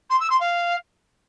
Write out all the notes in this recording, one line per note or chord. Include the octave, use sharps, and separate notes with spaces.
C6
E6
C6
F5